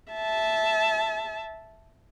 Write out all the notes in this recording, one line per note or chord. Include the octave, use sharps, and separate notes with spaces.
E5 A5